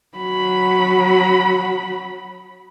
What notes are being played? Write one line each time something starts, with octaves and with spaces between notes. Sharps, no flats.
F#3 B5